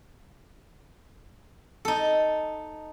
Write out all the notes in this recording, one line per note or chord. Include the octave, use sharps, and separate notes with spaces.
D#4 A4